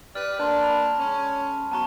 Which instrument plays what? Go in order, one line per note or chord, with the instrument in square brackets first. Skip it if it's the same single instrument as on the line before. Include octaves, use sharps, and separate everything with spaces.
[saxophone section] G4 B4 D5 [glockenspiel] F6
[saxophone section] A#3 D4 [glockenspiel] A5 C6
[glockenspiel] B5
[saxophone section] G#3 C#4
[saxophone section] F#3 B3 [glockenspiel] A5 A#5 C#6